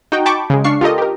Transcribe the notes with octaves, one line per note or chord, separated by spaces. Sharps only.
D#4 F#4 G5
G5 A5 B5 C#6 D6
C#3 G#3
D4 F5 C#6 C7
F4 G4 A4 A#4 D#5
G4 A#4